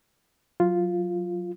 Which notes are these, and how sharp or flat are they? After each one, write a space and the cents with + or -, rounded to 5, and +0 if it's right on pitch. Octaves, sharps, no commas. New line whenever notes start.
F#3 -15 F4 +0